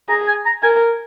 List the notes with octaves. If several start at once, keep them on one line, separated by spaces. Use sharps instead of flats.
G#4 A#5
G#5
A#5
A#4 G#5